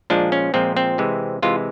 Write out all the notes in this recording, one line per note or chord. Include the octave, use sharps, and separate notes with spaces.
A#2 F3 G#3 D4
C#4
A#2 F3 G#3 C4
C4
C3 E3 G#3
C3 E3 G#3 F4